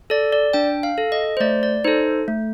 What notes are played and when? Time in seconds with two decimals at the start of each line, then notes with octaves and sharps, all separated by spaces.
0.10 A4 D5
0.32 D5
0.53 D4 G5
0.83 F5
0.98 A4
1.12 D#5
1.37 C5
1.40 A3 D5
1.63 D5
1.84 D#4 A4 C5
2.28 A3